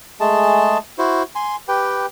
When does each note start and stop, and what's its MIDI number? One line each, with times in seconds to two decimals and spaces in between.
0.20 0.78 56
0.20 0.78 57
0.20 0.78 68
0.20 0.78 81
0.98 1.23 64
0.98 1.23 66
0.98 1.23 72
1.35 1.56 80
1.35 1.56 84
1.68 2.06 67
1.68 2.06 71
1.68 2.06 79